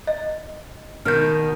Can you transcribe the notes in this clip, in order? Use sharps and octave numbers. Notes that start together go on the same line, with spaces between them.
D#5
B2 D#3 F6 G6